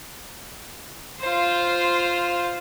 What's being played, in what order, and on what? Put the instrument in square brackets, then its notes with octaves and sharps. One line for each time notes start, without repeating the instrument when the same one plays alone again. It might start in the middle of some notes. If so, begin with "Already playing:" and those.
[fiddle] F4 C5